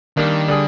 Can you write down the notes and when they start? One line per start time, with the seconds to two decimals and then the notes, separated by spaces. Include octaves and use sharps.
0.17 D#3 G3 A#3 D4
0.48 D3 G3 D4 G#4